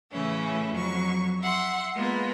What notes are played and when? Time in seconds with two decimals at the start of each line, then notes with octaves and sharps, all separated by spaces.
0.12 A2 C#3 E3 A3 C#4 E4
0.71 F2 F#3 C#6
1.41 E5 F#5 C6
1.95 G#3 A#3 B3 F4 B4